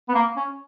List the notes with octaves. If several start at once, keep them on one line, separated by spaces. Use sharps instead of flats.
B3
A#3
C#4